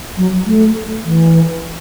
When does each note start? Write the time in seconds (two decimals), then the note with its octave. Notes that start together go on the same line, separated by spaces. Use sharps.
0.17 F#3
0.46 A3
1.05 E3